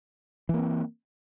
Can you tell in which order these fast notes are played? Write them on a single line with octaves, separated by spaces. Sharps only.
E3 A#3 C4